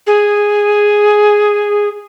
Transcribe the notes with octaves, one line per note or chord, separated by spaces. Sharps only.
G#4